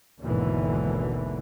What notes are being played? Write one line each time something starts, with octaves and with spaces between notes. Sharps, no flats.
G#1 D#2 B2 D3 E3